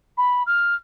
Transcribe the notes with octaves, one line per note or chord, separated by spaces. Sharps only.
B5
F6